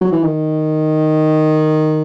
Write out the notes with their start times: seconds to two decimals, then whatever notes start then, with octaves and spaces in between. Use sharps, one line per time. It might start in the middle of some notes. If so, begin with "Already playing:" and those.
0.01 F#3
0.12 E3
0.23 D#3